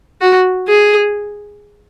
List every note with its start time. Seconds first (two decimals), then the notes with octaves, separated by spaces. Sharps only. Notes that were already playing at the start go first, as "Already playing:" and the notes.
0.21 F#4
0.68 G#4